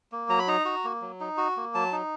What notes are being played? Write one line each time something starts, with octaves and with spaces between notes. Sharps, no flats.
A#3
F#3 A#5
B5
D#4 A#5
F#4
A#3
F#3
D#4
F#4
A#3
F#3 A5
D#4